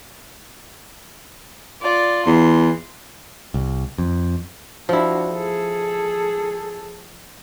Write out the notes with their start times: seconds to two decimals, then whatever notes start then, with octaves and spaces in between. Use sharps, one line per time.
1.82 F4 D5
2.26 E2 C6
3.54 C2
3.98 F2
4.89 F3 D4 E4 F#4
5.32 G#4 A4